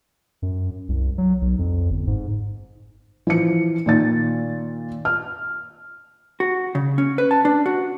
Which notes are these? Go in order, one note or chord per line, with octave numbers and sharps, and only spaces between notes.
F#2
C2
F#3
B1
F2
G1
G#2
E3 F3 C#7
A#2 D#3 A6
F6
F#4
C#3
C#4
B4
A5
D4
F#4